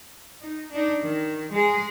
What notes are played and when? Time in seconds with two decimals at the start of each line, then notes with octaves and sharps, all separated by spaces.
0.41 D#4
0.72 D4 D#4
1.03 D#3
1.52 G#3 G#4